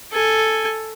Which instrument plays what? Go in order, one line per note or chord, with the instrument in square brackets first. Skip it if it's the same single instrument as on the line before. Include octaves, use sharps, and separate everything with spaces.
[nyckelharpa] A4 G#5